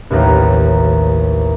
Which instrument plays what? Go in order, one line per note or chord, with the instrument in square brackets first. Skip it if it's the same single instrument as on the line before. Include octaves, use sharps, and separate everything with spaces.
[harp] A1 D#2 F3 A#5